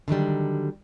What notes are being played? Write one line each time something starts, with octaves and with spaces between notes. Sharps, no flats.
D3 D#3 F#3 G3